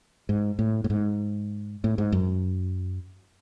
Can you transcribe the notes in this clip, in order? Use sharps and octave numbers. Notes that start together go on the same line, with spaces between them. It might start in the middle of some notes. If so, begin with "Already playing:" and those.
G#2
A2
A2
G#2
A2
G#2
F#2